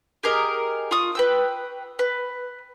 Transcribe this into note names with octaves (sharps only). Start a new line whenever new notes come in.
G4 G#4 A#4 D#5
F4 C#6 D#6
B4 G5 E6
B4